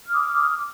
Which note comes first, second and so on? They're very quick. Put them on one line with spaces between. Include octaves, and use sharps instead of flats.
F6 D6 D#6